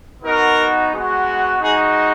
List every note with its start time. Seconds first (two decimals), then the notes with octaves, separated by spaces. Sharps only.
0.22 B3 D#4 F#4 A#4
0.91 G#3 B3 F#4
1.60 G#3 D#4 F#4 G#4